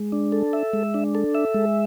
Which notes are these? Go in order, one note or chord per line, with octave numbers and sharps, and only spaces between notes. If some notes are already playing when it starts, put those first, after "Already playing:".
Already playing: G#3
D4
A4
E5
G#3
D4
A4
E5
G#3